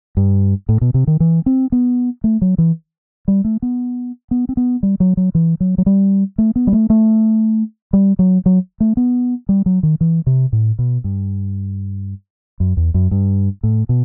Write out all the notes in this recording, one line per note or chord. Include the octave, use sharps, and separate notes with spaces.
G2
A2
B2
C3
D#3
E3
C4
B3
A3
F#3
E3
G3
A3
B3
B3
C4
B3
G3
F#3
F#3
E3
F#3
F#3
G3
A3
B3
G3
A3
A3
G3
F#3
F#3
A3
B3
G3
F#3
D#3
E3
C3
A2
B2
G2
F#2
E2
F#2
G2
A2
B2